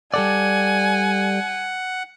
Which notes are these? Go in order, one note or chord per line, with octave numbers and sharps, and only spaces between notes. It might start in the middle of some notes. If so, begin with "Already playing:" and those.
G3 A4 D5 F#5 G#5